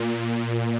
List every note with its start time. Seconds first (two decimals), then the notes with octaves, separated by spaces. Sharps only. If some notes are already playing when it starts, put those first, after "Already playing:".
Already playing: A#2